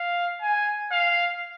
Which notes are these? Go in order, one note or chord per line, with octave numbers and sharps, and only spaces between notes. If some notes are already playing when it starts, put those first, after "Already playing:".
Already playing: F5
G#5
F5